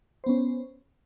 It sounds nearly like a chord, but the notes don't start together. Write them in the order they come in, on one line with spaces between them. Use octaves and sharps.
C5 B3 C#4